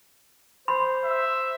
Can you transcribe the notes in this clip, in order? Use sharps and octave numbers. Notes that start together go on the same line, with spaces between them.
C5 B5 C6
E5